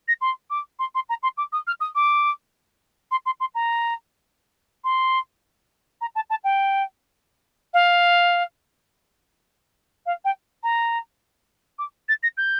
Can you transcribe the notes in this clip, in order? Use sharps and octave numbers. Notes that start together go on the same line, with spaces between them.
A#6
C6
D6
C6
C6
A#5
C6
D6
D#6
F6
D#6
D6
C6
C6
C6
A#5
C6
A#5
A5
A5
G5
F5
F5
G5
A#5
D6
A6
A#6
G6